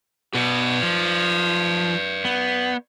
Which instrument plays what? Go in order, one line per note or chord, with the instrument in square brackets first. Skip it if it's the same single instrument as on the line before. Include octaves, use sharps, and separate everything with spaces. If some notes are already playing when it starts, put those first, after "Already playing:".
[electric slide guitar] B2 [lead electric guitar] B4 D5
[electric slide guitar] F3
B3